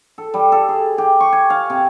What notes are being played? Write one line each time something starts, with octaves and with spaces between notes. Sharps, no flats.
A4
G3
A4
G#4
G4
C#6
G#5
F5
C3